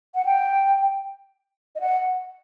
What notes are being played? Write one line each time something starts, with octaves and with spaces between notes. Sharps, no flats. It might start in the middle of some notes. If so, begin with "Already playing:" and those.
F#5
G5
D#5
F#5